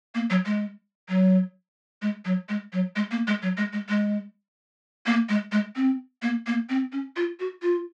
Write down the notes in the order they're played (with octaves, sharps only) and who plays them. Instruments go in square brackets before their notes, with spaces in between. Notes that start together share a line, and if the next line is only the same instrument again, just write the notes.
[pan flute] A#3
F#3
G#3
F#3
G#3
F#3
G#3
F#3
G#3
A#3
G#3
F#3
G#3
G#3
G#3
A#3
G#3
G#3
C4
A#3
A#3
C4
C#4
F4
F#4
F4